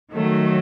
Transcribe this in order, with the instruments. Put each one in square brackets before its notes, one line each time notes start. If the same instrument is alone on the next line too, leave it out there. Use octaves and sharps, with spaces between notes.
[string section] D#3 F#3 A3